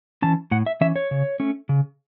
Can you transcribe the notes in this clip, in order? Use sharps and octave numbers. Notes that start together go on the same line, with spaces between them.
E3 C#4 A5
A2 F#5
E5
E3 C#4 E5
C#5
C#3
A3 C#4
C#3